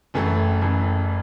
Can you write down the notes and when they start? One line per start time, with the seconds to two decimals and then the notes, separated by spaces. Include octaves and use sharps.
0.14 F#1 F#2 E3 A3
0.62 F#1 F#2 E3 A3